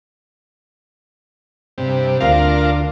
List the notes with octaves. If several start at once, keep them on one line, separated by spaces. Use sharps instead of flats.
G2 C3
D2 D4 F4 A#4 F5